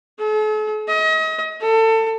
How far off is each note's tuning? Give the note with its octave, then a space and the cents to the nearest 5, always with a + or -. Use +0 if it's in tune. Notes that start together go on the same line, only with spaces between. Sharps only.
A4 -45
D#5 +35
A4 +25